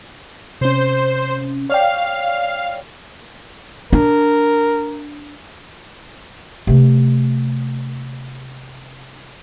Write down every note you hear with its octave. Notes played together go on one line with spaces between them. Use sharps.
C3 C#4 C5
C#5 D5 F5 G5
D4 A#4
C3 A3